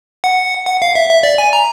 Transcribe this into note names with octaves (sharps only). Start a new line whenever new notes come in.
F#5
F#5
F5
E5
E5
D5
G#5
A#5